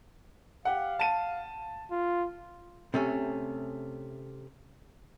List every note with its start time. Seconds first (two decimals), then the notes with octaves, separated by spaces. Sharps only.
0.65 G4 F5 F#5
0.99 A5 D#7
1.91 F4
2.94 C3 A3 C#4